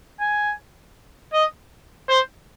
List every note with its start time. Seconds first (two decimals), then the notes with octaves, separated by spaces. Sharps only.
0.20 G#5
1.33 D#5
2.09 C5